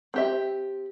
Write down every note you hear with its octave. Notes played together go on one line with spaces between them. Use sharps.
C4 G4 E5